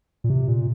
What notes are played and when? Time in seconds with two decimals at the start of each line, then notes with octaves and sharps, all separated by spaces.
0.24 A#2
0.30 C3
0.48 A#2